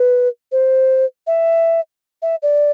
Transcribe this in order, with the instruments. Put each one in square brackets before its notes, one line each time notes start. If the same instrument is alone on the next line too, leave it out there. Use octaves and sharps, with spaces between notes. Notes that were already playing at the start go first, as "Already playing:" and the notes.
Already playing: [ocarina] B4
C5
E5
E5
D5